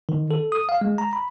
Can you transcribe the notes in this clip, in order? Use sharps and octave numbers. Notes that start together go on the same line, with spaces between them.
D#3
A4
D#6
F5
G#3
A#5
B5